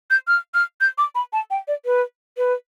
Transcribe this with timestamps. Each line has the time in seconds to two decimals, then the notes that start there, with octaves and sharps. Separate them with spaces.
0.10 G6
0.28 F6
0.54 F6
0.81 G6
0.98 D6
1.15 B5
1.33 A5
1.51 G5
1.68 D5
1.86 B4
2.38 B4